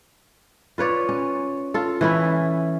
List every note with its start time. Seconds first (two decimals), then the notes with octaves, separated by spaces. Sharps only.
0.78 F4 B4 C#5 D5
1.09 C#4
1.74 F4 A4
2.01 E3 C#4 E4